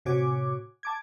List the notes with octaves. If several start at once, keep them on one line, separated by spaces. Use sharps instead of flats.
A2 C3 F#4 C#5 G#5 D6
A5 D6 G#6